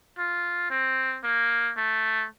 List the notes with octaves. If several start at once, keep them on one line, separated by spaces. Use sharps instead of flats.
F4
C4
A#3
A3